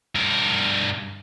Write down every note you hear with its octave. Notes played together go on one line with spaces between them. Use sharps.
G2 A#4